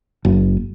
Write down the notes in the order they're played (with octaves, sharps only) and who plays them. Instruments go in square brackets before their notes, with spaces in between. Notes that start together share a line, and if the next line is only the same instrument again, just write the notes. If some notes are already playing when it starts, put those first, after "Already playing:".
[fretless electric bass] F#1